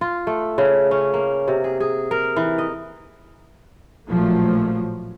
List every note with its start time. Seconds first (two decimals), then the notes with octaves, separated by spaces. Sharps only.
0.01 F4
0.27 A3
0.58 C#3
0.91 C#4
1.14 A#3
1.48 C3
1.64 G#4
1.80 G#4
2.11 A#4
2.36 E3
2.58 D#5
4.09 A1 A#2 F3 F#3 A3 A#3